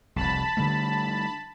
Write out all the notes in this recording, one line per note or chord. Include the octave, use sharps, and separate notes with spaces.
F1 C2 A5 B5
D3 G3 A3